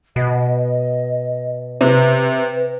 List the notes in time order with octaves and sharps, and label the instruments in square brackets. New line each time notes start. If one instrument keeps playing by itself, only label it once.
[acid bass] B2 [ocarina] D#5
[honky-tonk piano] C3 [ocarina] B4